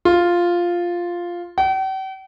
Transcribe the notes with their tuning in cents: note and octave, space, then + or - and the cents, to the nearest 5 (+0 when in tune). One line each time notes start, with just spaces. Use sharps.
F4 +0
G5 -45